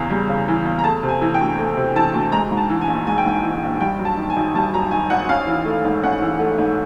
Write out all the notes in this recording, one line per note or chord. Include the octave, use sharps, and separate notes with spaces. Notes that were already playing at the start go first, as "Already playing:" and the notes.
Already playing: E2 C#3 E3 A#5
G3
C#3
E3
E2
A#5
A3 A5
C3
G#5
E3
G5
D2
A3
C3
E3 A5
D2
G#3 A#5
G#2
A5
E3
G#5
A#1
G#3 G#5
G5
G#2 G#5
E3
A#1
G3 G5
F#2
A5
D#3
G#5
G#1
G3 A5
F#2 A#5
D#3 G#5
G#1 F#5
C#4 F5
E3
A3
G#2
C#4 F#5
E3
A3
G#2